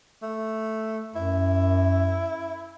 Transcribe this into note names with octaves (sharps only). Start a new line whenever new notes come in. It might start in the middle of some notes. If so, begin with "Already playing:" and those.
A3
F#2 E4